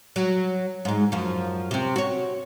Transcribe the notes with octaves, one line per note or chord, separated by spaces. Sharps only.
F#3
G#2 G#3
F#2 F3
C3 C4
F#4 C#5